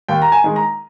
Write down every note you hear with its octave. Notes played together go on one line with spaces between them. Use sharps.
D#2 G5
A#5
G#5
D#3 G#3
A#5